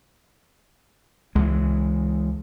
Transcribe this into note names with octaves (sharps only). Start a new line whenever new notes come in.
C#2 E3 G#3